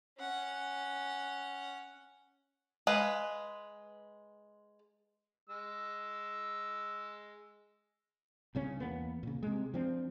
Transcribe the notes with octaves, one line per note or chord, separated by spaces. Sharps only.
C#4 F#5
G#3 B4 F5
G#3 E6
C2 C#3 C#4
E2 A#3 B3
A#2 C#3
C3 G#3
F3 C4 D4